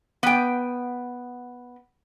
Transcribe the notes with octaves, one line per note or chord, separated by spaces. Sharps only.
B3 G5